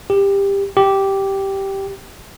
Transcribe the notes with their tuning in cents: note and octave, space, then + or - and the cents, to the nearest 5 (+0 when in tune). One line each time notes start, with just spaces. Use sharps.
G4 +20
G4 -5